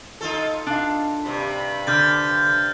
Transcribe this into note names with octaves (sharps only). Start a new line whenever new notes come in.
D#4 F4 A4
D4 F5
G2 C3 B5
D3 F6 G6 A6